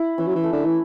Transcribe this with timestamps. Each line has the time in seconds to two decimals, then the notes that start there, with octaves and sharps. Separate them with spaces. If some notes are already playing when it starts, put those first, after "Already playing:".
Already playing: E4
0.18 E3 C#4
0.28 F#3
0.36 E3
0.44 A3
0.53 D3
0.66 E3